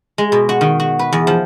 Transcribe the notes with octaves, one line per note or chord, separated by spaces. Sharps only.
G#3
B2
F#4
D#3
F#4
B4
E2
F3